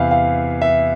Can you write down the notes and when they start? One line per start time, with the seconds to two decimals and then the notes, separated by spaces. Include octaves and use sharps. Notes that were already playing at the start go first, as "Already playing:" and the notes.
Already playing: E2 C3 E3 F5
0.11 F5
0.62 E5